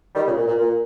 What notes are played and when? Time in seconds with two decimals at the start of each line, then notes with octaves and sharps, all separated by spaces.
0.14 D#3 G3
0.25 A#2 C#3
0.37 A#2
0.47 A#2
0.58 A#2